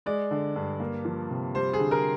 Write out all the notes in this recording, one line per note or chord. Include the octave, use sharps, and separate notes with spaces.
G#3 D5
D3
G2
A#3
F3
C3
G3 C5
G#4
D3
A#4